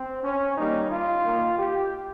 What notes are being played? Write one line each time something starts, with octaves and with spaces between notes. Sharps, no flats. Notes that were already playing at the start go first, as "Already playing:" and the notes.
Already playing: C4
C#4
D#3 G3 A#3 D#4
F4
D#3 A#3
G4